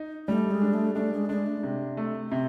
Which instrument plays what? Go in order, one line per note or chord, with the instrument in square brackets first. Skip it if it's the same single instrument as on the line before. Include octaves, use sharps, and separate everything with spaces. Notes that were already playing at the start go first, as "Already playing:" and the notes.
Already playing: [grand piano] D#4
[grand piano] G3 [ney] A3
[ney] G#3
[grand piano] D4
[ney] A3
[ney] A3 [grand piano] D4
[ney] G#3
[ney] G#3 [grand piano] D4
[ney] A3
[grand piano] C3
A3
[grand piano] C3 [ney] C4